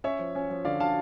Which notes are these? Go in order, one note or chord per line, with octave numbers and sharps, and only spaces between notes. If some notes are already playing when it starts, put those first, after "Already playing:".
C#4 C#5 E5
F3
C#4
F3
D3 D5 F5
D3 F5 A5